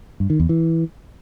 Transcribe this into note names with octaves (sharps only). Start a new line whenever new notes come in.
G2
D#3
E2
E3